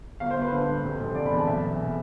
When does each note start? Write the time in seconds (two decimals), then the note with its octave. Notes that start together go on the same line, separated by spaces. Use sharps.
0.20 G1 F5
0.31 C5
0.37 G1
0.42 B4
0.52 D3 C5
0.68 G2
0.83 F1
1.00 F1
1.15 D3 D5
1.26 B5
1.31 E2
1.37 A5
1.47 B1 E5
1.63 B2